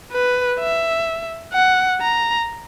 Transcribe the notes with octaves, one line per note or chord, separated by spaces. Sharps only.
B4
E5
F#5
A#5